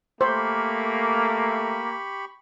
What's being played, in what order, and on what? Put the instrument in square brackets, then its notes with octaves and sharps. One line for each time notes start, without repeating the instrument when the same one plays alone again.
[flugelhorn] A3 [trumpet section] A#3 [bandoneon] G4 B5 C#6 [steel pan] C5